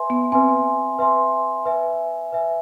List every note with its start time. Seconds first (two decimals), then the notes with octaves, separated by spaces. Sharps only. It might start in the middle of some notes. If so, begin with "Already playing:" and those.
Already playing: B4 E5 G#5 C6
0.10 B3
0.32 C4 B4 E5 G#5 C6
0.99 B4 E5 G#5 C6
1.65 B4 E5 G#5
2.32 B4 E5 G#5